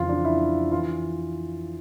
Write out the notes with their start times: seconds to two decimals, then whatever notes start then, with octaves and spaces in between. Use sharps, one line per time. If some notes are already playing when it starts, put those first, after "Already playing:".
Already playing: F2 C#3 E3 F4
0.09 D4
0.25 E4
0.72 E3 F4